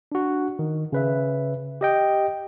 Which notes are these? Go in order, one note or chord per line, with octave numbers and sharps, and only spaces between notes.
D4 F#4
D#3
C#3 B4 E5
G4 D#5 G5